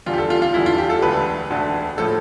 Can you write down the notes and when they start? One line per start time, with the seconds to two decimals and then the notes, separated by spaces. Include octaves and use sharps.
0.06 E2 D3 G3 F4
0.13 G4
0.18 A4
0.30 F4
0.42 F4
0.54 E2 D3 G3 E4
0.66 F4
0.78 G4
0.90 A4
1.02 E1 D2 D3 B4
1.50 E1 D2 D3
1.98 A2 F3 A4